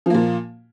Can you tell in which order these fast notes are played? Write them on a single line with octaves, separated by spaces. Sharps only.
F3 A#3 A#2